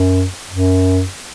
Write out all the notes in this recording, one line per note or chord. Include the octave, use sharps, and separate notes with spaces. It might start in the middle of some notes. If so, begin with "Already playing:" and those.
Already playing: F#2
F#2